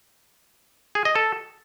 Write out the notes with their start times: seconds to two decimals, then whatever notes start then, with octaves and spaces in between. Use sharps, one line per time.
0.95 G#4
1.05 D#5
1.16 A4